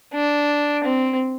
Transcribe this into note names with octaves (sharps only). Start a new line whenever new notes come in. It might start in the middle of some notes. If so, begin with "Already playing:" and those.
D4
C4